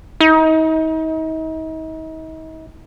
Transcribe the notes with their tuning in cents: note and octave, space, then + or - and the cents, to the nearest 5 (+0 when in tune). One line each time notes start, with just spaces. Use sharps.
D#4 +40